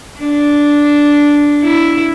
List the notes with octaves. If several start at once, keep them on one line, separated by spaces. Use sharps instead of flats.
D4
E4